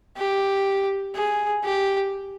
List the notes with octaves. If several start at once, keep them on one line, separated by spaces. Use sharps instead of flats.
G4
G#4
G4